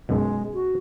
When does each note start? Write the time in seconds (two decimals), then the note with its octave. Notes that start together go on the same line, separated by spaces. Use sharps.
0.09 B1 F#2 B2 G#3
0.54 F#4